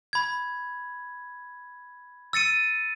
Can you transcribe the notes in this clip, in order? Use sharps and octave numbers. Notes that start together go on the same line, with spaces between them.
B5 G#6
E6 A6 C#7 D#7